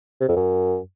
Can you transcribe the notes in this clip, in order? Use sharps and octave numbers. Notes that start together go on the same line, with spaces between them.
C3
F2
F#2